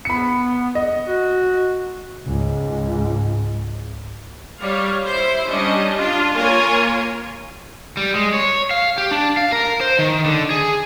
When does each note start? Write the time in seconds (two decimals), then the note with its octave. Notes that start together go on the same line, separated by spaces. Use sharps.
0.05 B3 B5 C#7
0.75 D#5
1.07 F#4
2.24 C#2 G#2
4.60 G3 C#5 F5
5.06 E4 C5
5.48 G3 C#4 D4 D#5
5.95 D4 F4
6.34 A#3 F4 A#4 C#5 G#5
7.97 G3
8.15 G#3
8.34 C#5
8.71 F5
8.98 G4
9.11 D4
9.37 F5
9.52 A#4
9.81 C5
9.99 D#3
10.26 D3
10.50 G#4